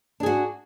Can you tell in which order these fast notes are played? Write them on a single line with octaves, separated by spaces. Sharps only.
D4 G#4 F#4